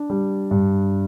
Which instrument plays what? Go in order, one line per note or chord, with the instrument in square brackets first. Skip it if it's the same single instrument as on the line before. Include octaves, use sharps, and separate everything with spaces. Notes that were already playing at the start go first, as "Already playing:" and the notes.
Already playing: [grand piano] D4
G3
G2